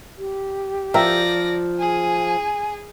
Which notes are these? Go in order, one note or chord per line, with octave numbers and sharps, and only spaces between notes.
G4
F3 A#4 D5 E5 G5 A#6
G#4 G#5